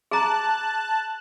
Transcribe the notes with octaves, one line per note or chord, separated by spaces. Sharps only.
G#4 A5 A#5 F#6